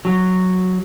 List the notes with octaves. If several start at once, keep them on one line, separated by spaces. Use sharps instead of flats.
F#3